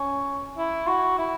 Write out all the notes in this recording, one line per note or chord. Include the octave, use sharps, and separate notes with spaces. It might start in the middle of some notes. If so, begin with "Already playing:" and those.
Already playing: C#4
E4
F#4
E4